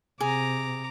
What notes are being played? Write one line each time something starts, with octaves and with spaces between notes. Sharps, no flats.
C3 G#4 A#5 D6